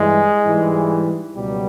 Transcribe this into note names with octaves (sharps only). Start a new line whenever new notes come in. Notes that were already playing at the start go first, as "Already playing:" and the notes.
Already playing: G2 E3 G3 G#3
G#2 E3 G3
C#2 B2 F#3 G3